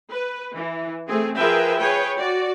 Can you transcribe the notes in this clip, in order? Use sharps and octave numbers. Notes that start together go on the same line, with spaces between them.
B4
E3
A3 C4 G#4
F3 G#4 A#4 B4 E5 G5
G#4 B4 C#5 G5
F#4 D5